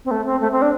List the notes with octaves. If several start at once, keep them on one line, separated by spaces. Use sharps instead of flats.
C4
A3
C4
A3
C4
D4